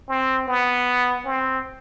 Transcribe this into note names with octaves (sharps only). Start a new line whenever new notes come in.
C4
B3
C4